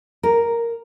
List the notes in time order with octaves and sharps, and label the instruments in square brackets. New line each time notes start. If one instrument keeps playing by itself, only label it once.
[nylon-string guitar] A#4